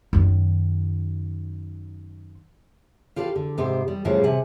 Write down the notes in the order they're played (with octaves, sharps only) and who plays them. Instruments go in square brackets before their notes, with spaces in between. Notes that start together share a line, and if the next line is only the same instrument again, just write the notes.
[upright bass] F#2 D#3
[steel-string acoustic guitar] F4 G4 A4 B4 D#5 F5
D3
G#2 C3 B3 G4 C5
G3
A2 C#3 F3 G3 A#3 G4
C3 F#5 G#5